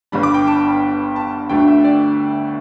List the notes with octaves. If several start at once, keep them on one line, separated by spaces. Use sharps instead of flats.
G1 G2 G3 D4 B5
D6
G5
A5
A5
D2 D3 A3 D4 G5
E5
D5